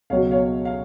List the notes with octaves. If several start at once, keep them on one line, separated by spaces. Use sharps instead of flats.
C#2 B2 F#3 C#5 F5
C#5 F5
F5